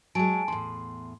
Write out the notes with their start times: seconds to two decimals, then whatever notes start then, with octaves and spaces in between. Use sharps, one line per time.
0.15 F#3 G#3 G#5 A5 D7
0.48 E2 A2 C6